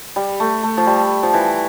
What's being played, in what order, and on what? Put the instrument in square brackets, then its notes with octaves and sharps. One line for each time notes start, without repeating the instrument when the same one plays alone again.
[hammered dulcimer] G3
A3
A3
F3
G3
F3
E3